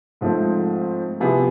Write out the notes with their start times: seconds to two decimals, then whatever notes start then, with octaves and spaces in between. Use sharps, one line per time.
0.21 G#2 F3 A3 C4
1.20 C3 F3 B3 E4 G#4